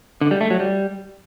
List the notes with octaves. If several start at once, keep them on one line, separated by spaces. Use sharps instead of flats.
D3
G3
A3
F#3
G3